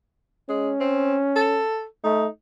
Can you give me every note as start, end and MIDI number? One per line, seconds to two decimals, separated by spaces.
0.49 0.71 56
0.49 1.64 61
0.80 1.15 60
1.36 1.84 69
2.04 2.27 57
2.04 2.27 63